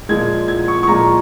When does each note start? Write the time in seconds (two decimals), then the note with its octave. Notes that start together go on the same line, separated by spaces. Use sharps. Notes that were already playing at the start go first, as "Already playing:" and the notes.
0.09 A#2 F3 G#3 G#6
0.48 G#6
0.68 C#6
0.83 C#6
0.87 A#2 F3 G#3 A#5